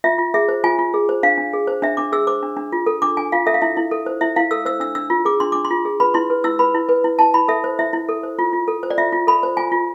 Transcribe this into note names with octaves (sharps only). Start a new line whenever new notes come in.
F4 E5
F4
G#4 E5
C5
F4 G#5
F4
G#4
C5
D4 F5
D4
G#4
C5
D4 E5
D4 D6
G#4 E6
C5 D6
D4
D4
F4
A4
D4 D6
D4 G#5
F4 F5
A4 E5
F5
E4 E5
E4
A4
C5
E4 E5
E4 F5
A4 E6
C5 E6
D4 E6
D4 E6
F4
G#4 D6
D4 C6
D4 D6
C6
F4
G#4
B4 B5
E4 C6
B4
E4 E6
B4 B5
E4
B4
E4
E4 A5
E4 B5
A4 E5
C5
E4 E5
E4
A4
C5
F4
F4
A4
C5
D5
F4 E5
F4
A4 B5
C5
F4 G#5
F4